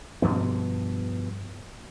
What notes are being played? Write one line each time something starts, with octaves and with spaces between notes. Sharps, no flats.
G2 B2 F3 B3